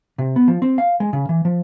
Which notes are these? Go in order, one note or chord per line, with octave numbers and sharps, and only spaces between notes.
C3
B3
F3
C4
F5
G#3
C#3
E3
F3